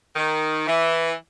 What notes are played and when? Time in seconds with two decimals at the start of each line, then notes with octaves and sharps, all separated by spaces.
0.16 D#3
0.67 E3